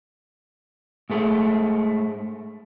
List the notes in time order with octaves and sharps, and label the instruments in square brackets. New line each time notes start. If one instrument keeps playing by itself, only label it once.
[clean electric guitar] G#2 G#3 A3